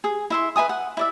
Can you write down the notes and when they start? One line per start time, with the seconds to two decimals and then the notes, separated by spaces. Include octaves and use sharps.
0.04 G#4 D#6
0.30 E4 E5 C6
0.56 B4 E5 G#5 D#6
0.69 F#5
0.97 E4 D5 E5